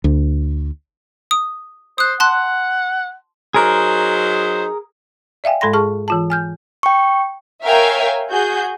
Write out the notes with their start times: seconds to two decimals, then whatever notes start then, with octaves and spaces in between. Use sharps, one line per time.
0.04 D2
1.31 D#6
1.98 C5 D#6 F#6
2.20 F#5 A5 C6 F#6
3.54 F#3 D#4 G#4 A#4 C5
5.44 D5 E5 F5 G5 G#5
5.61 G#2 G#3 A4 B5 C6 A#6
5.73 G#4 A5 C#6 F6
6.08 E3 F4 A5
6.30 G#5 F6 G6
6.83 G5 C#6
7.65 A#4 C#5 E5 F5 G5 G#5
8.29 F#4 G#4 G6